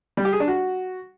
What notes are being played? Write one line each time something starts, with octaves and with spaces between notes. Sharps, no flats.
G3
G4
G#4
D4
F#4